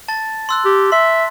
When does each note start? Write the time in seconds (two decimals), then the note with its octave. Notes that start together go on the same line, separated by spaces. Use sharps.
0.08 A5 A6
0.49 C6 E6 F#6
0.65 G4
0.92 E5 C6